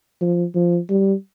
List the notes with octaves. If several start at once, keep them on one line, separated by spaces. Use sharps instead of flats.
F3
F3
G3